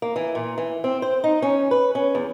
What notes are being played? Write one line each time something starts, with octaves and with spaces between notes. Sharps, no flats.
A#3
E3
A#2
E3
C4
C5
D#4
C#4
B4
C#4
E2